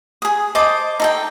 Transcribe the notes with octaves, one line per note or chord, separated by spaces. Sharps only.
G#4 D#6
C5 D#5 A5 D6
D#4 A4 G5